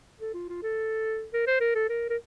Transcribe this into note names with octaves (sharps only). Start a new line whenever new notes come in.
A4
F4
F4
A4
A#4
C5
A#4
A4
A#4
A#4